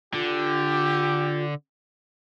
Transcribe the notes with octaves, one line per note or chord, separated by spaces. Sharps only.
D3 F4 G4